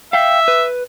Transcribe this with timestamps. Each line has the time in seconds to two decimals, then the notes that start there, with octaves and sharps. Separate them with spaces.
0.13 E5 F5 G5
0.48 B4